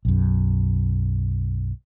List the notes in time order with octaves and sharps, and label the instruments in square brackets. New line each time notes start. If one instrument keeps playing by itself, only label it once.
[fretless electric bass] B1 F#2